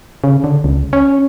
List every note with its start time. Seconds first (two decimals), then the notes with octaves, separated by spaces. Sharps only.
0.24 C#3
0.44 D3
0.64 C#2
0.93 C#4